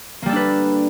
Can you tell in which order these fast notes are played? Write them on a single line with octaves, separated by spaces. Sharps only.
A#3 G3 A4 D4 B4